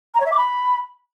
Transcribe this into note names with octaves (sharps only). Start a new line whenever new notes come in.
A#5
C#5
E5
D6
B5